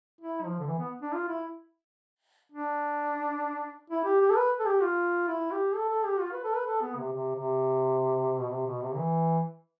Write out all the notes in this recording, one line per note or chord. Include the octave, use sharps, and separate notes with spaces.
E4
F3
D3
E3
B3
D4
F4
E4
D4
E4
G4
G4
A4
B4
A4
G4
F4
E4
G4
A4
A4
G4
F4
B4
A4
B4
A4
B3
C3
C3
C3
B2
C3
B2
C3
E3